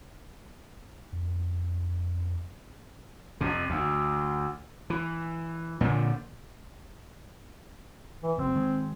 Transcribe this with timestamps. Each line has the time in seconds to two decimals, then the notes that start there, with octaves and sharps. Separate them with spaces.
1.13 F2
3.41 F2 C3
3.70 D2
4.90 E3
5.81 A#2 D3 F3
8.23 E3
8.38 F#1 C4
8.55 D#3 G#3